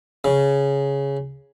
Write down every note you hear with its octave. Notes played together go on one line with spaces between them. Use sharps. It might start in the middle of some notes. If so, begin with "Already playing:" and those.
C#3